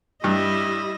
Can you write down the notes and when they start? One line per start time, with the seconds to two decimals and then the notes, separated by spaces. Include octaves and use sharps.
0.24 G2 G3 E4 D#5